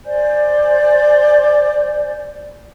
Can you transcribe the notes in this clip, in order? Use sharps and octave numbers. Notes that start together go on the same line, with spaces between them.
C5 D5 G#5 G6